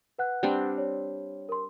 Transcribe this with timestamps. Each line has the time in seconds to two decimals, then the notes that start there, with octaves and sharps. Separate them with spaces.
0.19 B4 F#5 F#6
0.43 G3 C4 D4
0.78 C#5
1.49 A#4 C6